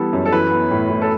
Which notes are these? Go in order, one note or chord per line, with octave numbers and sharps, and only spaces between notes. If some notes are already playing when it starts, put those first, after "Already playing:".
Already playing: E3 G3 B3 A4
F#2
A4
E3 B4
B3
A2
A2
A4